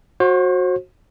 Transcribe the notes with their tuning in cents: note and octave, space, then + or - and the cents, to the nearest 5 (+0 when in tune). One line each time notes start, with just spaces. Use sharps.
F#4 -15 C5 +35